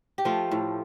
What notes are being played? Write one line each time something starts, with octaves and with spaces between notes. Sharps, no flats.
G4
F3 A3 F4
A2